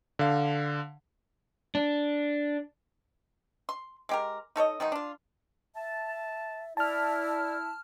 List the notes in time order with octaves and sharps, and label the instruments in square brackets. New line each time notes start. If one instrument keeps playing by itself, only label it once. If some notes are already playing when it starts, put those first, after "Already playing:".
[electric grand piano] D3 F5
[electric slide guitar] D4
[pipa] C6
G#3 G4 A#4
D#4 A4 C#5 D#5
D#3 F#3 G#3 D#4
D4 F4
[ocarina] E5 [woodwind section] A5
[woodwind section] E4 [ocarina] D5 [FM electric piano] A5 F6